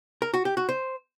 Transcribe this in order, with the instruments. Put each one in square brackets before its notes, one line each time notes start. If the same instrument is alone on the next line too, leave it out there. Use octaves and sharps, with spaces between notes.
[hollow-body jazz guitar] A#4
F#4
G4
F#4
C5